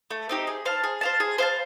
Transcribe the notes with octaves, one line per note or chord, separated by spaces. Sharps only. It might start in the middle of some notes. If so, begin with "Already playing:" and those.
A3
C4 D#4 G4
G#4
C5 F5 A5
G#4
C5 F5 A5
G#4
C5 F5 A5